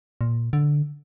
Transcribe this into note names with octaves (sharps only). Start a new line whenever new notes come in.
A#2
D3